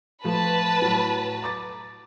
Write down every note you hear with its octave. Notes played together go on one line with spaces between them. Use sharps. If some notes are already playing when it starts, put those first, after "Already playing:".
F3 A3 B4 A5 B5
A2 F#3
A#5 D6 A6